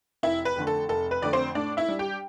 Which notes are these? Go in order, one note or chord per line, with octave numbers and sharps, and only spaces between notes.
F1 E4 E5
B4
F2 D3 A3
A4
F1 A4
B4
F2 D3 A3 D5
C4 C5
A2 D4 D5
E4 E5
G3 D4
G4 G5